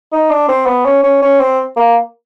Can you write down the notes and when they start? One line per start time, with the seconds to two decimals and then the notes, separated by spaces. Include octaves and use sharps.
0.12 D#4
0.30 D4
0.48 C4
0.66 B3
0.85 C#4
1.03 C#4
1.22 C#4
1.40 C4
1.76 A#3